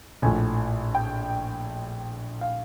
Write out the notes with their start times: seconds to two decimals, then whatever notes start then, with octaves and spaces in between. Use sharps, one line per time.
0.22 A#1 A2 F3 G#5
0.95 G5
2.41 F5